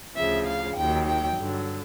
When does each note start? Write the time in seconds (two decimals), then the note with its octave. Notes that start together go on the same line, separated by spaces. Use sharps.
0.16 D2 C#3 F3 E5
0.46 F5
0.76 D#2 D#3 F#3 G5
1.07 G5
1.37 G2 D3 F#3